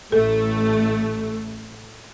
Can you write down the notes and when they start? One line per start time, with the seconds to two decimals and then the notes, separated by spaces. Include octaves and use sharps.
0.12 A1 A3 A4